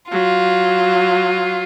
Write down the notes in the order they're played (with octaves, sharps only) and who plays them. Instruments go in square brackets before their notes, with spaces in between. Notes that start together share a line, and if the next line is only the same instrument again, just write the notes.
[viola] F#3 [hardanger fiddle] F4